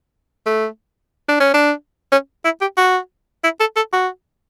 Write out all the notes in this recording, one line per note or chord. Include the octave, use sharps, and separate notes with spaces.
A3
D4
C#4
D4
C#4
E4
G4
F#4
E4
A4
A4
F#4